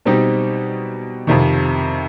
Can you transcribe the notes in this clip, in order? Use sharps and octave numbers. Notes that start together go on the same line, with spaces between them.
B2 G3 C4 D#4 G4
F2 C3 D#3